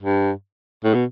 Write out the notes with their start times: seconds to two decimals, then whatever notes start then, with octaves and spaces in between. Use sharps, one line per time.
0.02 G2
0.84 A2
0.94 B2